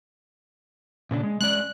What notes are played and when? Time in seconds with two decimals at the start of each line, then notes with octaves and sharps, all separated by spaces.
1.11 A#2 C#3 D4
1.23 G#3
1.41 G#3 C#4 D5 F#6